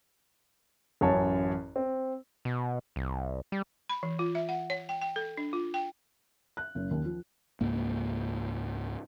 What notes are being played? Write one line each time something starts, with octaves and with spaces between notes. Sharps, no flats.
A1 F#2 C#5 A5
C4
B2
C2
G3
B5
E3
F4
E5
F#5
C#5
G5
G5
A4
D4
F4
G5
F#6
F#1
D#2
F3
C#2 G#2 A#3